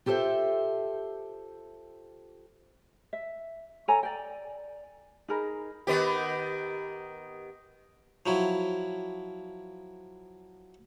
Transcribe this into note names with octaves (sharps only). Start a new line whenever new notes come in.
F4 G4 A4 C5 E5
E5
A4 C#5 G#5 A#5
D5 G5
D#4 G#4 A#4 B5
D#3 B3 G4
F3 F#3 E4